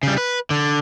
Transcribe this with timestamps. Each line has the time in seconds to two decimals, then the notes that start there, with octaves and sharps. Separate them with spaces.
0.03 C#3 G3
0.18 B4
0.50 D3